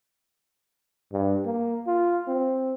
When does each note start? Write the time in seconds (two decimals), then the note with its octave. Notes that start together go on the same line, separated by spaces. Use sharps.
1.13 G2
1.45 A#3
1.87 F4
2.28 C4